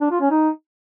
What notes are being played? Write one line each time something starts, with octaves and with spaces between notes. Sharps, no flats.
D4
F4
C#4
D#4